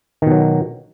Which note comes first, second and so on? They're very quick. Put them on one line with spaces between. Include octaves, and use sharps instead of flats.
D#3 B2 F#3